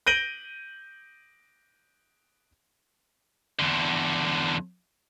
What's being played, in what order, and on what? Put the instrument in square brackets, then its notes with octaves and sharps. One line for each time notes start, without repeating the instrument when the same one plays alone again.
[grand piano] G6 A#6 D7 D#7 F#7 G7
[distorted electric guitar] E2 D3